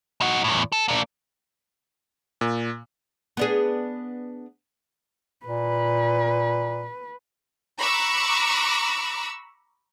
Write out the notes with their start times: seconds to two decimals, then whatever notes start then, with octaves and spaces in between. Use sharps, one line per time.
0.21 D#4 F#4
0.44 E2 A2
0.72 A4
0.88 A#3 D4
2.41 A#2
3.37 B3 D4 G#4
5.46 A#2 B4
7.81 A#5 B5 C#6 D6 E6 F#6